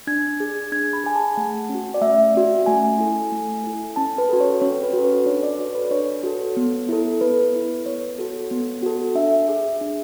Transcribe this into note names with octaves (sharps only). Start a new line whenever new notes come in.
D4 G#6
G#4
D4 G#6
B5
G#4 G#5
A5
A3 F#5
C#4 F#4
D5
A3 E5
C#4 F#4
A3 G#5
E4 A4
A3
E4 A4
C#4 A5
B4
F#4 A4
C#5
C#4 C#5
B4
F#4 A4
B4
D4 C#5
D5
F#4 A4 C#5
B4
D4 C#5
F#4 A4
B3
E4 A4
B3 B4
E4 A4
B3 C#5
F#4 A4
B3
F#4 A4
D4 E5
G#4
D4